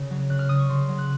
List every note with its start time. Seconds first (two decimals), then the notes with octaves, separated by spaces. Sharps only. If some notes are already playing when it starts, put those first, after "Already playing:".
Already playing: C#3
0.10 F#3
0.30 C#3 F#6
0.39 F6
0.49 C#3 D#6
0.59 C#6
0.69 C#3 C6
0.88 F#3
0.98 F#6